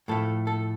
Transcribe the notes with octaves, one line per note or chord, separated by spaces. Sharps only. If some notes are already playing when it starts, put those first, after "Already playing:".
A2 F3 A3 A4
A4